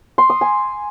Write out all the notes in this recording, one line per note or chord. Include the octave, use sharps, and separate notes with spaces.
C6
D#6
G#5